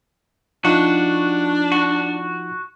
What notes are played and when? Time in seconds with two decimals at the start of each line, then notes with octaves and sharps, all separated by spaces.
0.65 F3 D4 D#4 F4 F#4
1.72 F#4